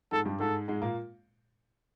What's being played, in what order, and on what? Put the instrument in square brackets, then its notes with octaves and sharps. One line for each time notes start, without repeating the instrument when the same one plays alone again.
[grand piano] G#2 G#3 [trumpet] A4
[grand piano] G2 G3
[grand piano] G#2 G#3 [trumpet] A4
[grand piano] G#2 G#3
A#2 A#3